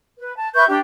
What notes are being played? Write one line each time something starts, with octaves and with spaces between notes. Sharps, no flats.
B4
A5
B4 E5 C#6 G6
D4 G4 G5